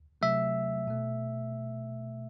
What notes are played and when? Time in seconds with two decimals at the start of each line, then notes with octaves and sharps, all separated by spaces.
0.22 C3 F#3 A3 E5
0.88 B2 A3